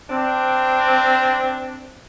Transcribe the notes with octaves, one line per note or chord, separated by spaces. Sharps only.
C4 D4